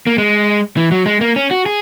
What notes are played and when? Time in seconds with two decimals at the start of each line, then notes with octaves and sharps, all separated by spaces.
0.07 A#3
0.18 G#3
0.77 E3
0.91 F#3
1.06 G#3
1.21 A#3
1.36 C#4
1.51 F#4
1.66 G#4